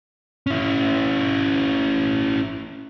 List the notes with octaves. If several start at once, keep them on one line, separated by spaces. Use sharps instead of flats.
C#4 E4